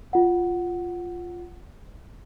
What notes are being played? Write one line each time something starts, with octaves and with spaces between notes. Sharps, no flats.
F4 F#5